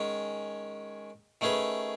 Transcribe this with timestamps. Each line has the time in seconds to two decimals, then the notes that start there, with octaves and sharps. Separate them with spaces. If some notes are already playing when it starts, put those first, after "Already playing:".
Already playing: D#3 G#3 C#4
1.41 D#3 A3 C#4 G#4 B4